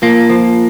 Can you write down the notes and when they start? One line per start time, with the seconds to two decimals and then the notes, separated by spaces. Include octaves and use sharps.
0.02 F3 A#3
0.30 F3